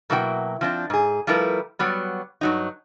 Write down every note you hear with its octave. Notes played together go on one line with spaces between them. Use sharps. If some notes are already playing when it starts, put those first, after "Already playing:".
B2 F#3 A#3 E4 C5 G5
F3 C4 D4
G#2 G#4
F3 G3 A3 E4 A#4 B4
F#3 G3 B3
G2 F#3 D#4